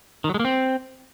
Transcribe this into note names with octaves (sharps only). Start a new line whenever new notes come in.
D#3
F#3
G#3
A#3
C4